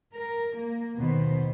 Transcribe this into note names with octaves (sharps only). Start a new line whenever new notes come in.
A#4
A#3
D#2 B2 D#3 B3 C5